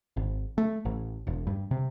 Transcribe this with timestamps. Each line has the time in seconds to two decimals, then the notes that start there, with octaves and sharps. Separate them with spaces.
0.17 G#1
0.58 A3
0.85 A1
1.27 E1
1.47 G2
1.71 C3